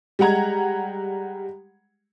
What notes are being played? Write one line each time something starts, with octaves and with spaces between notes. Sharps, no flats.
G3 G#3 F#5 A#5 G#6